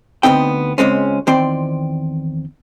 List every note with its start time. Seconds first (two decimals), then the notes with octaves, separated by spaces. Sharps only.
0.23 D2 B3 C4 D#4 G5
0.78 C#2 G#3 C4 C#4
1.27 E2 D#3 C4 C5 D5 G5